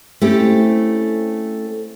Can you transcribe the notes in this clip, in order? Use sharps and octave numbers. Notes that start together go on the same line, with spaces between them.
A3 C4 C#4 E4 G4